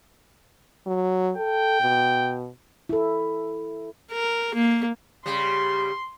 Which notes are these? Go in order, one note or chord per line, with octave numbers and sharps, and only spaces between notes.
F#3
A4 G5
B2
E4 A4
A#4
A#3
C#3 G3 C6